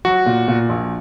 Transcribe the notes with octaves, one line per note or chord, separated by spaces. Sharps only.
F#3 F#4
A#2
A#2
A#1